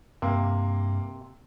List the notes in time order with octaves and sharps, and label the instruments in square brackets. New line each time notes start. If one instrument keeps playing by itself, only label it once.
[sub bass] G2 [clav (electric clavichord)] C3 [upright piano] A#3